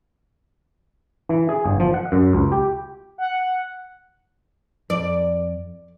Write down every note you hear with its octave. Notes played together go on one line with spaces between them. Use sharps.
E3
G#4
G1
F3
F#5
F#2
C#2
G4
F#5
F2 D5